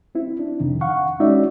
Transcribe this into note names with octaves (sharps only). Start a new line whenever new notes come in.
C4 E4
D4
F2 C3 D#3
F5 F#5 C#6
G#3 C#4 D#4 F#4 D5 E5